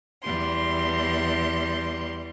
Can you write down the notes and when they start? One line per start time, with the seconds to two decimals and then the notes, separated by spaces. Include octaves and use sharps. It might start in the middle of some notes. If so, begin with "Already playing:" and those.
0.23 E2 G3 C6